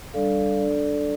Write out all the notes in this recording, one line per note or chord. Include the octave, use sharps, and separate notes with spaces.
G3 D4 A4 D5 F5
D4 A4 D5